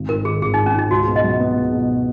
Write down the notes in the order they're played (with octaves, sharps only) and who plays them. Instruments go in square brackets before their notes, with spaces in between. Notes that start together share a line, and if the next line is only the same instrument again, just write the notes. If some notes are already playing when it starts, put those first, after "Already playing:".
Already playing: [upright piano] G#1
[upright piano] G#2 [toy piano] A#4
[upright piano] D#3 [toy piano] G#4
[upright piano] G#1 [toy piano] G#4
[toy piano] D#4
[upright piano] G#1
[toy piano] C#4
[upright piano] G#2 [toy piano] D#4
[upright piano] C#2 [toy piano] F#4
[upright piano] B2
[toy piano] D#5
[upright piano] F#3
B3
C#2
B2